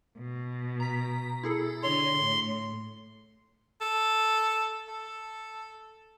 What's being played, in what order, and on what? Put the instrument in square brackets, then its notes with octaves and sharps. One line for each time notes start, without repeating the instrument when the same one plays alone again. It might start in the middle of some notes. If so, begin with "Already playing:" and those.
[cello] B2
[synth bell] A#5 B6
E4 G#4 A4
[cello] D3 [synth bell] C#5 [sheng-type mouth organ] C6
[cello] A2
[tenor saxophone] A4
A4